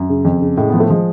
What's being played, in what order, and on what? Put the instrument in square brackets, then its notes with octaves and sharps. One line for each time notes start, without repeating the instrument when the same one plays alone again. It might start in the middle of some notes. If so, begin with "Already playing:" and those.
Already playing: [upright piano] F#2
C#3
F2
C#3
A2 G#3
F3 B3
A3
F3 G#3